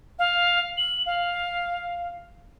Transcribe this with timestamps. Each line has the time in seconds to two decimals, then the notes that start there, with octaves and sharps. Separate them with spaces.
0.19 F5
0.77 F#7
1.06 F5